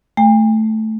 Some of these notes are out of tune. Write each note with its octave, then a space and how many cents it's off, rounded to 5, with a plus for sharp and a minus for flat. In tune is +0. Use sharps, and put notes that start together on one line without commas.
A3 -5 G5 +45